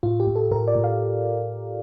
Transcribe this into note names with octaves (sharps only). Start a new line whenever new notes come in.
A2 F4
G4
A2
A4
A2 A#4
D5
A2
F5